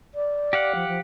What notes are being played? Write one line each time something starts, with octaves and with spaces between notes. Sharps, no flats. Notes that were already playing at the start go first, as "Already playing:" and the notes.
D5
G4 F5 F#5
F3
F3